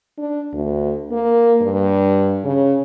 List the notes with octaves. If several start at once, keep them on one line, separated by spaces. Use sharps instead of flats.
D4
D2
A#3
G2
C#3